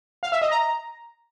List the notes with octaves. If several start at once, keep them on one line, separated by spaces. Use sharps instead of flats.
F5
E5
D#5
A#5